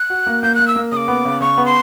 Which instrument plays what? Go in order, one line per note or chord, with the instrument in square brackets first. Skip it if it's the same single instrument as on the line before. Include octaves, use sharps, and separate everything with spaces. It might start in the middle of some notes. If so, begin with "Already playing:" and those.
Already playing: [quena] F#6
[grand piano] F#4
A#3
[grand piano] A#3 [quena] G6
[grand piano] A#3 [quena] F#6
[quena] E6
[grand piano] A#3
[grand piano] C#3 [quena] D6 D#6
[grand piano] B3
C#3
[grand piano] C#3 [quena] C#6
[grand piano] B3
[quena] C6